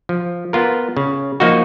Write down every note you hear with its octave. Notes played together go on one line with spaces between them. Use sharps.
F3
B3 F4 A#4
C#3
F3 A#3 D#4 F#4